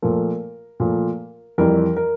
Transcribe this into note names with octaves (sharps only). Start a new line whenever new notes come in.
A#2 F3 A3 A#4
A#2 F3 A3
F2 E3 G3 A#4
A#4